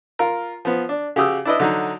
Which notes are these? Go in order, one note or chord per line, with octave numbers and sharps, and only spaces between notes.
F4 A#4
F3 B3
D4
C#3 F#4 G4 D#6 E6
D4 E4 B4 D#5
D3 F#3 D#4